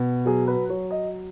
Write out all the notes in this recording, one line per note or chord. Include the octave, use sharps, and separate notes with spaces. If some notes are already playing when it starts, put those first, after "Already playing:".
Already playing: B2
F#3 G#4
B4
F#3 C#5
D#5